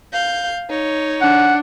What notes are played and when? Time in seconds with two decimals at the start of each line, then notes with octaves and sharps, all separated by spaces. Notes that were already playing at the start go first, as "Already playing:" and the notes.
0.13 F5 G6
0.69 D#4 C#5
1.21 D4 F#5